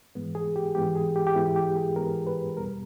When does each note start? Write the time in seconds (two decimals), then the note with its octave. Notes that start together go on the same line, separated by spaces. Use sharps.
0.15 G#2 E3 G#3 B3
0.35 G#4
0.56 G4
0.75 G#2 E3 G#3 B3 G4
0.95 G#4
1.16 G4
1.27 G4
1.35 G#2 E3 G#3 B3 E4
1.56 G4
1.76 G#4
1.96 G#2 E3 G#3 B3 A#4
2.27 B4
2.57 E2 B2 G3 B3 A#4